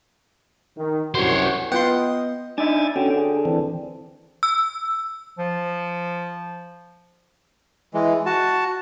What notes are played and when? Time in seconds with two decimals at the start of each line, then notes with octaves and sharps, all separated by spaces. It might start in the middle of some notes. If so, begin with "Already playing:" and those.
0.76 D#3
1.15 C2 F#2 F#4 C5 C#5
1.72 B3 F4 D#5 F#5 G5 C6
2.58 D4 D#4 E5 G#5 G#6 A6
2.96 D3 C#4 F#4 G5
3.18 G#4
3.45 E3 C4 D4
4.43 E6
5.39 F3
7.94 E3 G#3
8.26 F#4 A5